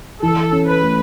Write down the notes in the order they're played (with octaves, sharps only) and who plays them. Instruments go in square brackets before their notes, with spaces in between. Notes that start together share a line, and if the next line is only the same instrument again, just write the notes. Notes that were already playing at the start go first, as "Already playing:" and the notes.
[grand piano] E3 [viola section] A4
[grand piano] C#4
[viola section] B4
[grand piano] A3